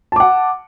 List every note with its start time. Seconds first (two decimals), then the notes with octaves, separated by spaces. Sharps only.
0.12 A5
0.16 D6
0.20 F#5